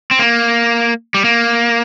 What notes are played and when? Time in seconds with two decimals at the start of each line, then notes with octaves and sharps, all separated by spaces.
0.11 C4
0.19 A#3
1.14 G3
1.25 A#3